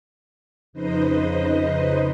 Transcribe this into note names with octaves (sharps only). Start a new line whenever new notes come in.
F2 C#3 D#4 B4 C5 D#5